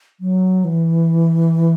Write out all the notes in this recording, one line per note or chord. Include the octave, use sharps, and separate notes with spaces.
F#3
E3